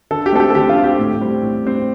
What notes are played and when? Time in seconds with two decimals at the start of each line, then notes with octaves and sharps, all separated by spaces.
0.11 D3 A4
0.26 G4
0.32 A3 C4 A4
0.40 G4
0.50 A4
0.55 D3 G4
0.69 F4
0.77 A3 C4
0.84 G4
0.99 A2
1.21 G3 C4
1.43 A2
1.65 G3 C4